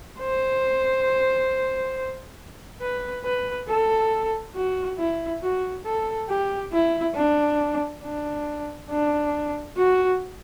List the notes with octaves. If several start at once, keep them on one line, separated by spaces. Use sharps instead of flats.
C5
B4
B4
A4
F#4
E4
F#4
A4
G4
E4
D4
D4
D4
F#4